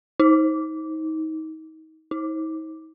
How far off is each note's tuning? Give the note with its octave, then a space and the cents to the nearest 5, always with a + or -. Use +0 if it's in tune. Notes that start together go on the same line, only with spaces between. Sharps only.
D#4 +30
D#4 +45